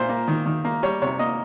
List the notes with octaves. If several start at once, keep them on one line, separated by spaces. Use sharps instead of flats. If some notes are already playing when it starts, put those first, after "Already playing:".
Already playing: A#2 C5
A#3
D#3
D#3
A#3
G3 C#5
C3 C#5
A#3 D#5